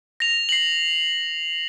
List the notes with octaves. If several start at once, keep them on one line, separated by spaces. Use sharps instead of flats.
A#6 F7
C7 F#7